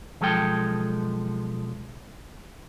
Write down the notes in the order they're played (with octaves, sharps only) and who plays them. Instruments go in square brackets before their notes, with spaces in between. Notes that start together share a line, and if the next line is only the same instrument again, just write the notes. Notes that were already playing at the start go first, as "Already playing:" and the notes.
[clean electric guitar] B1 F3 G#3 A4 G5